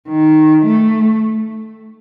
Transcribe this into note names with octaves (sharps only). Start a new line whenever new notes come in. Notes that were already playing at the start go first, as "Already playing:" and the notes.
D#3
A3